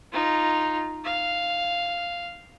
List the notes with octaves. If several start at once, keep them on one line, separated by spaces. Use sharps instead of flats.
D#4 F4
F5